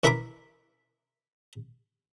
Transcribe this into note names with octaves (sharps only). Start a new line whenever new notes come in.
E3 E4 A#4 A#5 B5 D6